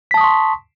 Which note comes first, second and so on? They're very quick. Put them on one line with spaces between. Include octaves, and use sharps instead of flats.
B6 A5 D#6 C#6 C6